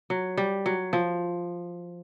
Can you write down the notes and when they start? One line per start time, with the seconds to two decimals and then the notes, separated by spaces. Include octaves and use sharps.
0.10 F#3
0.37 G3
0.66 F#3
0.93 F3